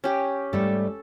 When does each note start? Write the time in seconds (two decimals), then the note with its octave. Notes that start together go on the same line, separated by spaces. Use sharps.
0.04 C#4 G4
0.53 G#2 G3 A3 A4